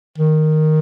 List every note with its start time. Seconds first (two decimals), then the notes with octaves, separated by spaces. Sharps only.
0.18 D#3